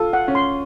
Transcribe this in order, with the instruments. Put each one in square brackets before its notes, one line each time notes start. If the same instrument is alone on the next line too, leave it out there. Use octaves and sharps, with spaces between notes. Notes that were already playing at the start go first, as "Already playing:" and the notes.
Already playing: [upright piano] F4 [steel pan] A4
[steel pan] F#5
[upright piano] C#4
[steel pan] C6